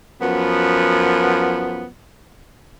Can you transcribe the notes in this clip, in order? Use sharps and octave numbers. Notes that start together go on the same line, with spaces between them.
F#2 F3 B3